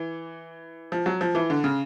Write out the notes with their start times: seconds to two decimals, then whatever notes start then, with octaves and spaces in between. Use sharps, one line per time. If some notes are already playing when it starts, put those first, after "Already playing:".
Already playing: E3
0.92 F3
1.06 F#3
1.21 F3
1.35 E3
1.50 D3
1.64 C#3